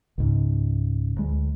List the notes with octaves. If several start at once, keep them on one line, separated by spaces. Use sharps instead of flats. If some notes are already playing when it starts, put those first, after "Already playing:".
C#2 G#2 C#3
D2 G#3